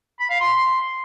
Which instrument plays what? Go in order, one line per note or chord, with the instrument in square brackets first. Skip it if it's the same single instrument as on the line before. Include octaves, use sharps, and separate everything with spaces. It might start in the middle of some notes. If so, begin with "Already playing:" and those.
[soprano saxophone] B5
F5
C6